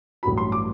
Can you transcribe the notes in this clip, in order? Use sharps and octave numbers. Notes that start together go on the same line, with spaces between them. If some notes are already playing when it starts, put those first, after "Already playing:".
A1 G2 F#3 B5
C6
D6